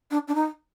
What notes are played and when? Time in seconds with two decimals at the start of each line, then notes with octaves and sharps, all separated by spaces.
0.11 D4
0.28 D4
0.35 D#4